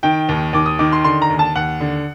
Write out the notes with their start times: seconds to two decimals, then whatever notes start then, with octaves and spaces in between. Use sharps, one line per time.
0.03 D#3 G5
0.29 D#2
0.53 D#2 D6
0.66 D#6
0.79 D#3 D6
0.92 C6
1.04 D3 C6
1.22 A#5
1.30 D#2
1.39 A5
1.55 D#2 F#5
1.80 D3